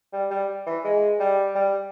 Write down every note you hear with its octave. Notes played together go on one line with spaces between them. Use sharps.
G3
G3
E3
G#3
G3
G3